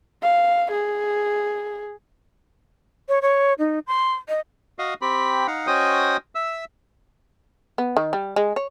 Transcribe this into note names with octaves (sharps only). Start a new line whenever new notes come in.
F5
G#4
C#5
C#5
D#4
C6
D#5
F#4 D#5 F5
C4 G4 B5
D#4 F5 F#5
C#4 F#4 C5 D#5 G5 D#6
E5 E6
B3
D#3
G3
G#3
C#5